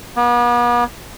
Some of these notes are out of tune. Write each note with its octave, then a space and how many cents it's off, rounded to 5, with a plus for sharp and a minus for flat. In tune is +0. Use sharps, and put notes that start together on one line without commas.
B3 -40